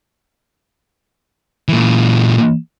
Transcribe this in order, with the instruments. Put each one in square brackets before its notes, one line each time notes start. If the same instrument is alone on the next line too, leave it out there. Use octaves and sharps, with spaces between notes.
[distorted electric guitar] A#2 E3